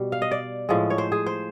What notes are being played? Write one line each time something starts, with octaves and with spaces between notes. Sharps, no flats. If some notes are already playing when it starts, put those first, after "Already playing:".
Already playing: B2 G3
F5
D#5
D5
A2 F3 G#3
C#5
C5
G#4
C5